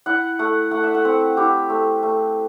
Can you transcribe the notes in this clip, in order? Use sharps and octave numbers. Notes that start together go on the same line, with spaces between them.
E4 F#5
A3 F#5
A3 F#5
E5
F#5
C4
E4 G4
A3
A3